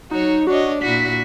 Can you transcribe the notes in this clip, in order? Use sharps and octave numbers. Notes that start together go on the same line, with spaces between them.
F#3 D#4 F#4 C#5
D4 F#4 C#5 D#5
A#2 E4 F#4 B6